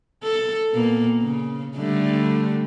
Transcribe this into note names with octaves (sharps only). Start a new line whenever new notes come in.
A4
A#2 A#3 B3
C#3
D3 G3 A3